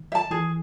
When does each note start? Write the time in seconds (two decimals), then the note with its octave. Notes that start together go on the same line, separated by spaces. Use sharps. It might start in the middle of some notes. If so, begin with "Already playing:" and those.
Already playing: D#3
0.12 E5
0.15 A5
0.31 E3 G#4